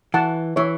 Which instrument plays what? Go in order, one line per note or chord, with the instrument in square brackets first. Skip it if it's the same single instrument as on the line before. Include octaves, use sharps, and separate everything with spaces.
[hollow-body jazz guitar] E3 [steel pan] F#5 A5
[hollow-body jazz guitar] E3 [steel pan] C#5 E5